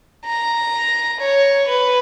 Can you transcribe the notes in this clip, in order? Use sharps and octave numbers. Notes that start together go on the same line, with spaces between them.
A#5
C#5
B4